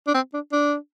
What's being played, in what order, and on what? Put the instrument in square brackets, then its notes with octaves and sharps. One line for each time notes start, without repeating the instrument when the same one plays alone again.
[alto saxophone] D4
C4
D4
D4